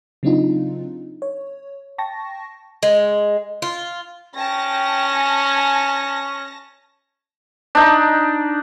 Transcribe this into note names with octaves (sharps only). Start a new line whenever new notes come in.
C#3 F#3 C4 D4 D#4 F4
C#5
G5 A5 C#6 A#6
G#3
F4
C#4 G5 A5 A#6
G#5
D4 D#4